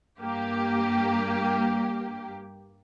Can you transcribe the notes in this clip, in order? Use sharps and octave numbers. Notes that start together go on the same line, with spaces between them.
G2 A#3 G4